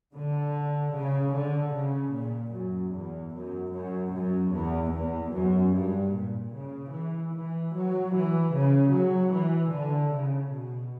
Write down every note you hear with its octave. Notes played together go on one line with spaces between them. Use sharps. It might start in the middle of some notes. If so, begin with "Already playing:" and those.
D3
C#3
D3
C#3
A#2
F#2
E2
F#2
F#2
F#2
E2
E2
F#2
G2
A#2
C#3
E3
E3
F#3
E3
C#3
F#3
E3
D3
C#3
B2